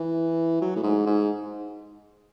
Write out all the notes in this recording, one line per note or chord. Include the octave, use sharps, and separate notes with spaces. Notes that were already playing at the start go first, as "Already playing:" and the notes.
Already playing: E3
F#3
A2
G#2
G#2